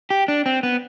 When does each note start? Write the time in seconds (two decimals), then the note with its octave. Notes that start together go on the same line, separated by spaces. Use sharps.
0.10 G4
0.28 D4
0.46 C4
0.63 B3